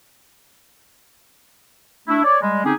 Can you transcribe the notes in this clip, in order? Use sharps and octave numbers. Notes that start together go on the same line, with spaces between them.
A3 D4 E4
C#5 D5
G3 G#3
D3 C4 C#4 D#4 G4 G#4